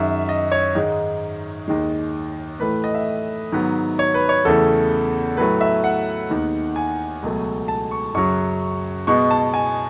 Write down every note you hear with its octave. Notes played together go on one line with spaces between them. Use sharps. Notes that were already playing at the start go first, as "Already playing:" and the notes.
Already playing: F#2 D#3 G#3 E5
D#5
C#5
G#2 D#3 G#3
D#2 D#3 G#3
A2 E3 A3 B4
D#5
E5
G#2 D#3 F#3 B3
C#5
B4
C#5
E2 C#3 E3 A3 A4
A2 F#3 A3 B4
E5
F#5
D#2 D#3 G#3 B3
G#5
C#2 B2 F#3 A3
A5
C#6
F#2 C#3 F#3 C#6
B2 G#3 B3 C#6
A5
G#5